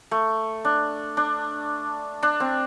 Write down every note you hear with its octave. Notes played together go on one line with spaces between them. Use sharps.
A3
D4
D4
D4
C4